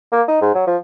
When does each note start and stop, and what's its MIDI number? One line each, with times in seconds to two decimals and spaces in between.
0.12 0.22 58
0.28 0.40 63
0.41 0.52 44
0.54 0.64 54
0.67 0.76 53